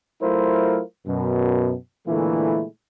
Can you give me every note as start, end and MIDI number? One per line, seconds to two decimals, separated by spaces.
0.21 0.81 54
0.21 0.81 57
0.21 0.81 64
0.21 0.81 65
0.21 0.81 70
0.21 0.81 72
1.06 1.74 42
1.06 1.74 47
2.07 2.64 46
2.07 2.64 50
2.07 2.64 52
2.07 2.64 56
2.07 2.64 57
2.07 2.64 64